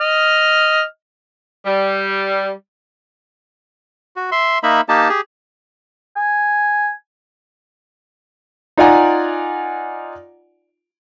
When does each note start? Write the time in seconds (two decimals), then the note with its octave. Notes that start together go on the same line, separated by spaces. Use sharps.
0.01 D#5 F6
1.66 G3
4.16 F#4
4.32 E5 C6
4.63 A#3 D#4 E5 B5
4.89 A#3 D#4 G4 A5
5.09 G4 G#4
6.16 G#5
8.78 D#4 F4 D5 F#5 G#5 A#5